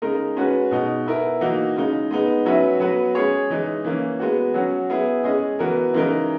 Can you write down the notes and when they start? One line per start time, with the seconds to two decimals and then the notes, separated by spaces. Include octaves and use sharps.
0.02 C#3 G#3 D#4 A#4
0.36 G#3 C#4 F#4 B4
0.71 B2 G#3 D#4
1.06 B3 E4 A#4
1.41 E3 A#3 D#4 F#4
1.76 C#3 G#3 D#4
2.11 G#3 B3 D#4
2.45 F#3 C#4 F#4 B4 E5
2.80 F#3 B3 F#4 B4
3.15 G#3 C#4 G#4 C#5
3.50 E3 G#3 D#4
3.85 E3 A#3 C#4
4.19 G#3 B3 F#4
4.54 F#3 C#4 F#4
4.90 B3 E4 G#4
5.24 G#3 C#4 G#4 D#5
5.59 E3 B3 F#4 A#4
5.94 C#3 E3 G#3 D#4 A#4